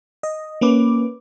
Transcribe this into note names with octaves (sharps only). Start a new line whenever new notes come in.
D#5
A#3 C#4 B4 D6